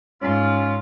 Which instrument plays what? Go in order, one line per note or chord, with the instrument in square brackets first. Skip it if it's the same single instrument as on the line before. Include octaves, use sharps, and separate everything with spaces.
[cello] G#2 [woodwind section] C#4 F4